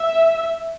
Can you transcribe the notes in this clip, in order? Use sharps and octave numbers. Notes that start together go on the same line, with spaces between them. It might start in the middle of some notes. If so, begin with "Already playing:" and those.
Already playing: E5